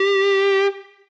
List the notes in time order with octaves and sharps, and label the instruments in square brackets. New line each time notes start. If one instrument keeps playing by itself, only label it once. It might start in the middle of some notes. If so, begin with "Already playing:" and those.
Already playing: [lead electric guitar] G4